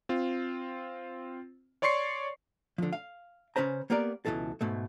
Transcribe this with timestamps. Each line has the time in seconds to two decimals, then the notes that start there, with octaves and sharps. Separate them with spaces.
0.09 C4 F4
1.82 C#5 D5 C6 C#6 C7 C#7
2.78 D3 F3
2.93 F5
3.56 C#3 C#4 B4 C5 A#5
3.90 A#3 B3 G4 A#4 D5
4.26 C#2 G#2 B2 E3 A4
4.61 G#2 B2 A3